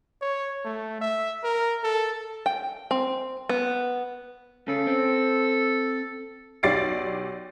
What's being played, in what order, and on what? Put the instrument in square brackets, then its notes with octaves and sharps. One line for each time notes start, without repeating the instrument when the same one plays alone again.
[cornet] C#5
A3
E5
A#4
A4
[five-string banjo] G5
C4
B3
[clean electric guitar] C#3 [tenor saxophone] A4
[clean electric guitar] C4
[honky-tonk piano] B1 G4 D5 A6 C7 D7